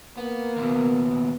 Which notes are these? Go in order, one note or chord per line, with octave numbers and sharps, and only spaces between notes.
A#3 B3
D#2 B2 B3